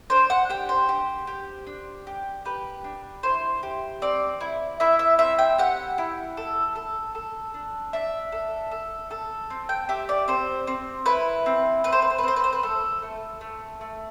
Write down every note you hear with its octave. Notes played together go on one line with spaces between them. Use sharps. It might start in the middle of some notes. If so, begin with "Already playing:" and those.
D4 C5
F#5
G4 G5
C5
G4
G4
D4
G4
G4 B4
D4
E4 C5
G4
C4 D5
E4
E4 E5
E5
C4 E5
G5
G4 F#5
E4
A4
A4
A4
D4
D4 E5
A4
A4
A4
C4
G5
G4 E5
D5
C4 C5
C4
E4 B4
C4
C4 B4
C5
B4
C5
B4
C4 C5
B4
C5
B4
A3 A4
A3
A3
A3